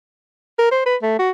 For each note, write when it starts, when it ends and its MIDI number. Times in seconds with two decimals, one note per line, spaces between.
0.59 0.71 70
0.72 0.82 72
0.86 0.96 71
1.02 1.18 57
1.19 1.31 66